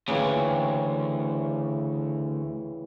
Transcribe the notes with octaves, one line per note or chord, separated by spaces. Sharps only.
D2 C#3 E3 G5